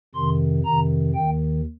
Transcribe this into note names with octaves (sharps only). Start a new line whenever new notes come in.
F2 C3 D#3 C6
F2 C3 D#3 A#5
D#2 D#3 G5